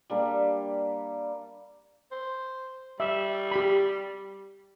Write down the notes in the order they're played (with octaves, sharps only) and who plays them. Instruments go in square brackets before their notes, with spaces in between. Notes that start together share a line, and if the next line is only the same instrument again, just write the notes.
[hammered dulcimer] G3 A#3 D4
[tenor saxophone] C5
[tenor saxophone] G3 [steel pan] E5
[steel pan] G4 B5